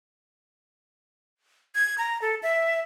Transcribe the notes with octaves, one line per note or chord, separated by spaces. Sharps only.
G#6
A#5
A4
E5